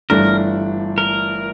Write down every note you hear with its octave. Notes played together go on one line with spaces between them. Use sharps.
G1 G2 E3 A3 D4 A#4
A#4